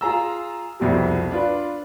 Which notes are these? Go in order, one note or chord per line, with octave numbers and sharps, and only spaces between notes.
F4 G#4 A#5 E6
C2 F2 B2 G3
D4 F4 B4